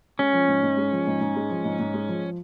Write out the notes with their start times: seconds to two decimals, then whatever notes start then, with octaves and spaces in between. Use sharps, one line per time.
0.19 G#3 C#4
0.33 F3
0.48 G#2
0.63 G#2
0.77 G#3
0.92 F3
1.07 G#2
1.21 G#2
1.36 G#3
1.50 F3
1.65 G#2
1.79 G#2
1.94 G#3
2.09 F3